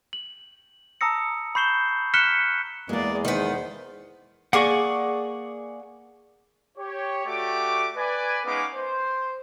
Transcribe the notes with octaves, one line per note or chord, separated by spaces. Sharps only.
F#7
A5 A#5 D#6 E6 A#6 C#7
B5 C#6 G6 C7 E7 G7
F6 F#6 B6 C#7 E7 G7
E2 G#3 A#3 G#4 D5
D#3 B3 C5
A#3 G#4 D5 F#5 C#6
G4 C#5
A3 F#4 G4 D5 D6
B4 D5 G#5
G#3 B3 C#4 D#4 F5 D6
C5